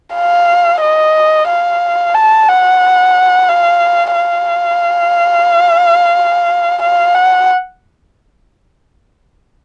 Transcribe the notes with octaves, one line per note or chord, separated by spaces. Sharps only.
F5
D#5
F5
A5
F#5
F5
F5
F5
F#5